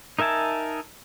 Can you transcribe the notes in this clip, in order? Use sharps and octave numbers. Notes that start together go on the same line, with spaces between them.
D#4 A#4 E5 G#5 A5